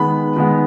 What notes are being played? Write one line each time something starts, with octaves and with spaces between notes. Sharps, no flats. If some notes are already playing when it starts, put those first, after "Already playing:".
Already playing: D#3 G#3 B3 B5
D#3 G#3 B3